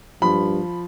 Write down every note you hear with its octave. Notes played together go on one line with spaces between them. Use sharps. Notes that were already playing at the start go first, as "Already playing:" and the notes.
G2 F3 B5